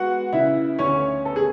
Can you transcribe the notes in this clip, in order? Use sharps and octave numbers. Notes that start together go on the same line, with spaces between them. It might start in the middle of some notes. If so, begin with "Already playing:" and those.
Already playing: G#3 B3 F#4 F#5
C#3 E4 E5
D2 C#4 C#5
B3 A4
G#4